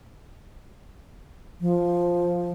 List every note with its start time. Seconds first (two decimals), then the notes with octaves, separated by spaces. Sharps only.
1.61 F3